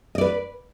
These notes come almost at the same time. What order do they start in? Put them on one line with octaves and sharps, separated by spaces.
D#5 D5 B4